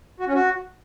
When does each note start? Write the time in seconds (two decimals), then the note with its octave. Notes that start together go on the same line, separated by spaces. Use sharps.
0.20 F#4
0.27 C#4
0.35 F#4